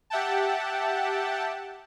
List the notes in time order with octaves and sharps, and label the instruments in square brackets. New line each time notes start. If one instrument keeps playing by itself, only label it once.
[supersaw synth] G4 E5 F#5 G5 A5